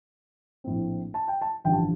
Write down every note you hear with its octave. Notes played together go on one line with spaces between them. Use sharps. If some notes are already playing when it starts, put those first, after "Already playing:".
A#1 A2 A3 C4
A5
G5
A5
A1 G2 D3 F3 G5
A5